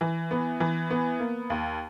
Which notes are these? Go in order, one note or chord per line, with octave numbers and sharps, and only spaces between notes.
E3
B3
E3
B3
A#3
D#2